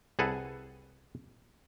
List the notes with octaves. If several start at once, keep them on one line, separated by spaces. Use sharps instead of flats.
C2 G#4 A4 B4 F#5